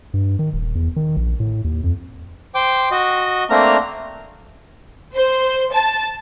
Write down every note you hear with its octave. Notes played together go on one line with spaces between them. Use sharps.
G2
D#3
D#1
E2
D#3
A#1
A2
D#2
F2
C5 G5 D6
F#4 D#5
A3 A#3 C4 D4 A#5 F6
C5
A5